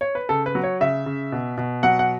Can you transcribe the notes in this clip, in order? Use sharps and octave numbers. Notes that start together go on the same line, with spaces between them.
C#5
B4
C#3 A4
B4
F#3
C#5
C#3 E5
C#3
B2
B2
F#3 F#5
F#5